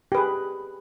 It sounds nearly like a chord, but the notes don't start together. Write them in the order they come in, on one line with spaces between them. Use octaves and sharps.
G4 B4 G#4